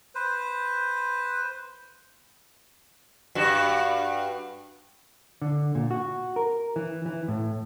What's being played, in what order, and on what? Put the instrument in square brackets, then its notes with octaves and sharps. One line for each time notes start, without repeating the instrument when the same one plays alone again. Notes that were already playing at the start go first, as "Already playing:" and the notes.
[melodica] B4 C5
[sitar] G2 F#4
[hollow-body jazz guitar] D3
A#2
F#4
A#4
E3
E3
A2